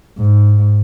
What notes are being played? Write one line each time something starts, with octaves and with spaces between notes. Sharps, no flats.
G#2